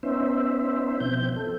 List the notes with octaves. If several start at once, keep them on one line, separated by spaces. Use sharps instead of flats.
B3 C#4 D#4 C5 E5
B2 F3 C4 G6
A4